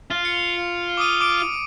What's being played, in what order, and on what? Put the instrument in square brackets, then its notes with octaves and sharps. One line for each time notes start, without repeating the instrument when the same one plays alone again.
[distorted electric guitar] F4
[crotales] C#7
D6 D#6 D#7
D6 D7